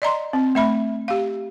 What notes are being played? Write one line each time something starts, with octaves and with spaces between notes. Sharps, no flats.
D5 D#5 A#5 C6
C4
A3 E5 B5
G4 F5